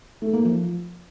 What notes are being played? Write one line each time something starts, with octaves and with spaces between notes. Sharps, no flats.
A3
A#3
F3